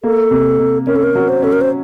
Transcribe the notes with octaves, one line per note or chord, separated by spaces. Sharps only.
A#3 A4
C3
C3
C#4 A#4
A4
A#4
F#3
C5
C#4 A4
A#4
C5